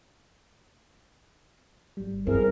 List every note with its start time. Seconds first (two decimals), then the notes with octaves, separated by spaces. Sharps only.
1.97 G#1 G3
2.27 G2 C4 E4 G#4 A#4